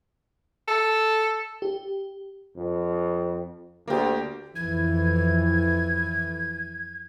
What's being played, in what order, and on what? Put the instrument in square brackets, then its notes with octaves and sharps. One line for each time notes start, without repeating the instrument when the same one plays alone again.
[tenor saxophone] A4
[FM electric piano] G4
[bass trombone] F2
[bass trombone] D2 [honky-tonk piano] A#3 G4
[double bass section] F2 E3 [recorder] G#6